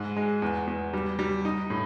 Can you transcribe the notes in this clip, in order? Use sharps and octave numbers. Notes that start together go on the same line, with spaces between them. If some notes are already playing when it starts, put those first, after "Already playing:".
Already playing: G#2
G#3
E2
E2
G3
G3
D#4
A2